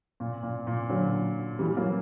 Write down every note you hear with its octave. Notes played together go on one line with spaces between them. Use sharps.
A#2
A#2
A#2
D3 F#3
E3 G3
F#3 A#3